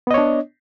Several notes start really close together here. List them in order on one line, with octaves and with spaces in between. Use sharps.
B3 D#5 C#5 D4